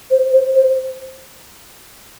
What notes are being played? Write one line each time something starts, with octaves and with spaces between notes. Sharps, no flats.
C5
C5
C5